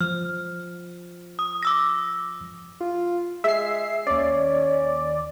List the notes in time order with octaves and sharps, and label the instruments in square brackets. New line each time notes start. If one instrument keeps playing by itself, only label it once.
[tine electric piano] F3 [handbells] F6
[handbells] D#6
D6 E6 A#6
[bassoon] F4
[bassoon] G#3 [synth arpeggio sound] E5 C7
[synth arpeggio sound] D#2 D5 [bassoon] C#4